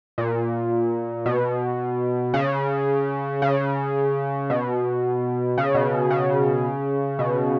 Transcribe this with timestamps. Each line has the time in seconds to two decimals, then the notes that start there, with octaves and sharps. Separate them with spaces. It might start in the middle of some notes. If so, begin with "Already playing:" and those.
0.18 A#2
1.26 B2
2.34 C#3
3.42 C#3
4.50 B2
5.58 C#3
5.75 B2
6.11 C#3
7.19 B2